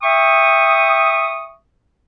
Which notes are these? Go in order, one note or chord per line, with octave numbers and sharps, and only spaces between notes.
E5 G5 C#6 D#6